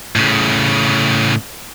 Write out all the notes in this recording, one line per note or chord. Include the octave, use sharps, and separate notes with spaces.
A2 C#3